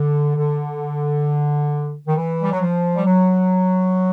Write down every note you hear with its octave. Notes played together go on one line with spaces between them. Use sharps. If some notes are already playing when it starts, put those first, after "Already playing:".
Already playing: D3
D3
D#3
E3
G3
F#3
F3
G3
F#3